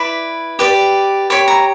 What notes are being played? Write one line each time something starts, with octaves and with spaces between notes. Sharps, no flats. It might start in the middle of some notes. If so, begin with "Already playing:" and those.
Already playing: E4 B4 D5 B5
G4 B4 D5
G4 C#5 B5
A#5